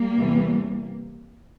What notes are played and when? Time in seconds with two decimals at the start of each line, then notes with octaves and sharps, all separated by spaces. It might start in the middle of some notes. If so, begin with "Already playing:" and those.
Already playing: G3 A#3
0.16 E2 C3 E3